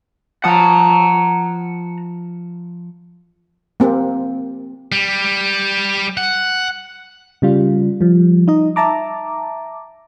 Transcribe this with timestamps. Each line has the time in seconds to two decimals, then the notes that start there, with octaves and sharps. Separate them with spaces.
0.44 F3 F#5 A5 A#5 D#6
3.80 A#3 C4 G4
4.92 G3
6.17 F#5
7.42 C#3 G3 F4
8.01 F3 G3
8.48 D#4 D#5
8.76 E5 A5 A#5 D6